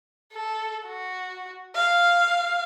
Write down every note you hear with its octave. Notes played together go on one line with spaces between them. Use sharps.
A4
F#4
F5